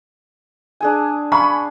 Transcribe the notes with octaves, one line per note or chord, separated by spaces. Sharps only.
D4 G#4 G#5
F5 G#5 B5 C#6